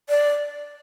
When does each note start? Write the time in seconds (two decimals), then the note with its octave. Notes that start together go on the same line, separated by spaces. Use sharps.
0.09 D5